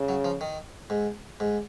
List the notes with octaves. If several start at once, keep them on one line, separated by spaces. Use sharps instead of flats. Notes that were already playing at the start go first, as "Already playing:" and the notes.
Already playing: C#3
F#3
F3
D#3
G#2
G#2